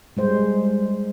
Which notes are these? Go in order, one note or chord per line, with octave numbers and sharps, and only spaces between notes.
G3 G#3 C5